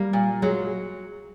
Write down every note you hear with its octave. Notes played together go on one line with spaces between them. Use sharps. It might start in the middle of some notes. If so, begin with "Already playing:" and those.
Already playing: G3 A#3
A#2
F#3 G#3